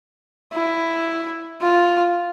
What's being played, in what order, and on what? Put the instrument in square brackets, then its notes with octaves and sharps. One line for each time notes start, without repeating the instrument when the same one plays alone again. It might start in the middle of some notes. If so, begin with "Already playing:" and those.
[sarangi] E4
F4